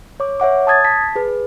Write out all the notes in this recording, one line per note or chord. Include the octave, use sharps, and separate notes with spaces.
C#5 D6
C#5 E5 F#5 D6
A5 D#6 G#6 A6
A5 B6
G#4 B4